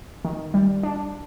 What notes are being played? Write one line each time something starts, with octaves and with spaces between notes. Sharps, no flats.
D#3
G3
D4